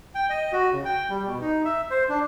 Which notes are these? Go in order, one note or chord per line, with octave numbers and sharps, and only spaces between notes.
G5
D#5
F#4
C#3
G5
G3
B2
D#4
E5
C5
D4